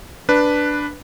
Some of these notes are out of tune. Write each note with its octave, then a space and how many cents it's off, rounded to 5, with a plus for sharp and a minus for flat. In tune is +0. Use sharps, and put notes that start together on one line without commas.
D4 +0 B4 +0